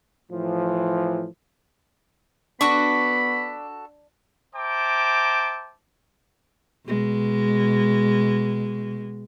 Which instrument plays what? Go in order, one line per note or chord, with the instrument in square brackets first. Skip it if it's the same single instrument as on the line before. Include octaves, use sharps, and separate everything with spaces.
[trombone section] A2 E3 F3
[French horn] B3 [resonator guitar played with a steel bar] D4 [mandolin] F#4 A4 C#6 [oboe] B5
[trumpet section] C5 E5 G5 A5 A#5 D6
[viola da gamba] B2 G#3